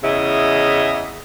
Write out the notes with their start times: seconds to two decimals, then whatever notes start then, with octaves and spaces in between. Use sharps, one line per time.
0.03 E2 C#3 E4 D#5